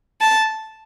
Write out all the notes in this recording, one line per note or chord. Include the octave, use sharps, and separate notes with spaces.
A5